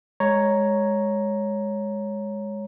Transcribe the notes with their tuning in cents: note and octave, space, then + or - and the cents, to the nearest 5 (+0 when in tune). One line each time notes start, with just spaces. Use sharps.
G#3 -10 C#5 +0 A#5 +0